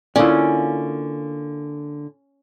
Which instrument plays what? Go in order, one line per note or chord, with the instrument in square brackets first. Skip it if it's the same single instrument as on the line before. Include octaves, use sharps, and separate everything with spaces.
[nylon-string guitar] D3 A#3 F4 [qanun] C#4 [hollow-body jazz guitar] E4 D5